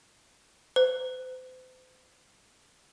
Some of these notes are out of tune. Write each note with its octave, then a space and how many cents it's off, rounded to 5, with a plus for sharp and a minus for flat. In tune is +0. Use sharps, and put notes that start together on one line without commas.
C5 -40